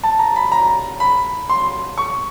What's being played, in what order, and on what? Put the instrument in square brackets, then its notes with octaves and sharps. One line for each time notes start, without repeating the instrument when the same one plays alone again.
[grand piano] A5
A#5
B5
A#5
B5
C6
C#6